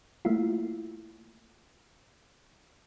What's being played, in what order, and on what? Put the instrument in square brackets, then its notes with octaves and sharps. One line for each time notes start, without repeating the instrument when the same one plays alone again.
[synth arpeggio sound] A3 A#3 E4 F4